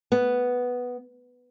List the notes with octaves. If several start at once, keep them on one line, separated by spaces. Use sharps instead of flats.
B3